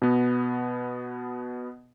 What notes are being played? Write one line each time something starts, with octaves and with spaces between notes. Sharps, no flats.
B2 B3